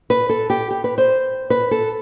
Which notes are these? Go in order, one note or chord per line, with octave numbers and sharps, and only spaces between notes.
B4
A4
G4
G4
B4
C5
B4
A4